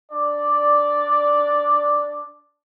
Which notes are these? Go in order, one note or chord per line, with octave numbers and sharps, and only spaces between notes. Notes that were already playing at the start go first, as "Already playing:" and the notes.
D4 D5